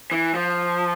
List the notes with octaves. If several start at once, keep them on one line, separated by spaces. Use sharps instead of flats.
E3
F3